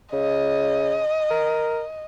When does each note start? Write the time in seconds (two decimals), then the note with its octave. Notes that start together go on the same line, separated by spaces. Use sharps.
0.13 C#3 D#5
1.30 A#4